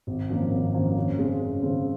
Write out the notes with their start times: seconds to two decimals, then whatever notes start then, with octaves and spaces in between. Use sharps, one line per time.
0.07 G#1
0.29 F#2 F3 A#3
0.51 G#1
0.74 F#2 F3 A#3
0.96 F#2
1.18 C#3 G#3 C4
1.40 F#2
1.63 C#3 G#3 C4